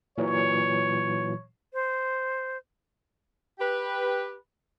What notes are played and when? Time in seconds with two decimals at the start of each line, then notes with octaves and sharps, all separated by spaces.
0.18 A#2 E3 F#3 C#5
1.73 C5
3.59 G4 B4